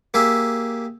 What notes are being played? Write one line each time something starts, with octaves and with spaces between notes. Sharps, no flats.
A#3 G4 G#4 E5